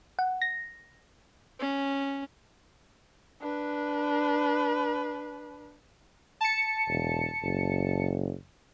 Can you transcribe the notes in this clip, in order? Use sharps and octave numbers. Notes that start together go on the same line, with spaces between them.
F#5
A#6
C#4
D4 B4
A5 C#7
E1
F#1